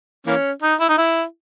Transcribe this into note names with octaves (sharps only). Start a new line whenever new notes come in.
E3 A#3 C#4
D#4
E4
D#4
E4